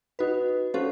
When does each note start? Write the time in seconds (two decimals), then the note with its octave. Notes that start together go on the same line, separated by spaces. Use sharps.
0.19 D#4 F#4 B4
0.74 C#4 F#4 A4 C5 F5